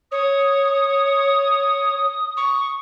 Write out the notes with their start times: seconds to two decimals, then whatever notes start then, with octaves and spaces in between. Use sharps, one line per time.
0.12 C#5 D#6
2.37 C#6